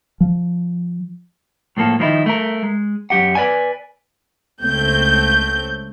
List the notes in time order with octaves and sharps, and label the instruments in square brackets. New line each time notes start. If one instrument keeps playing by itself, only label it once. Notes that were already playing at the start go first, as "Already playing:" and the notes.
[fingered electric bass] F3
[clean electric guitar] A2 F3 A#3 A4
D#3 F3 D#4 E4
A3 A#4
G#3
F#2 G4 F#5
B4 D5 G#5
[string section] C#2 A3 C4 G6